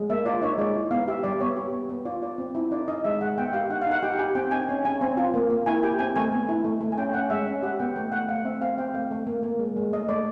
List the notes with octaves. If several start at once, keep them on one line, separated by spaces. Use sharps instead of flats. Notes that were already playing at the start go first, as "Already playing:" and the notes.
Already playing: G#3
A#3 E5
F4 D5
D#4 C#5
G#3 D5
E4
B3 F5
G4 E5
G3 D5
B3 C#5
G4
B3
B3
F4 D5
F4 D5
C4
E4
D#4 D5
D#4 D#5
G#3 E5
G#3 F#5
B3 G5
G4 F5
D#4 F#5
F5
D#4 F#5
G4 G5
G4 G#5
C4 G5
D#4 G#5
C#4
C#4 G#5
C4
F4
A#3
A#3
E4 G#5
G4 G5
C4 G#5
A3 G#5
B3
E4
A3
A3
G#5
C#4 G5
C#4 F#5
G#3 E5
C#4
G4 F#5
B3 G5
A3 G5
A3 F#5
A3 F5
C4 E5
C4 F5
C4 G5
A3 F5
A3
A#3
A#3
G#3
G#3
A3 D#5
A3 D5